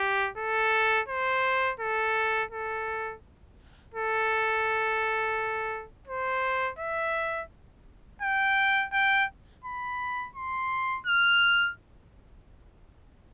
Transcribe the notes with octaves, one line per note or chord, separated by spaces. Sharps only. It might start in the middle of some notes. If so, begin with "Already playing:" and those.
Already playing: G4
A4
C5
A4
A4
A4
C5
E5
G5
G5
B5
C6
F6